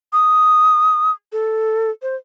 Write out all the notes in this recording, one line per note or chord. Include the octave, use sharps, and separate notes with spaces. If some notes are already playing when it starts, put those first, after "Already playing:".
D#6
A4
C5